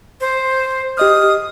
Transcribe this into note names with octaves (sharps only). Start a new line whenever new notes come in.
C5
G4 D#5 D#6 F6